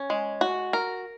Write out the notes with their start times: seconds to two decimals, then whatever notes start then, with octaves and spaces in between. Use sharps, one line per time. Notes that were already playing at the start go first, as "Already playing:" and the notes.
Already playing: C#4
0.10 G#3
0.41 F#4
0.73 A#4